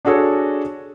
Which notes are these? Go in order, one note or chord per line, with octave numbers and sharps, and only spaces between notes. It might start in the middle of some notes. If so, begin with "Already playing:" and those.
D4 F#4 G#4 A4 C#5